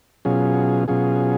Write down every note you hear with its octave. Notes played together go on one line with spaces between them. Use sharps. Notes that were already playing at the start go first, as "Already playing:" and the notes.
B2 F#3 C#4 F4 G#4
B2 F#3 C#4 F4 G#4